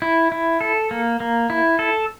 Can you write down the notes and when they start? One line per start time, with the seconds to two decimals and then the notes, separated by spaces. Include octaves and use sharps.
0.02 E4
0.32 E4
0.61 A4
0.91 A#3
1.20 A#3
1.50 E4
1.79 A4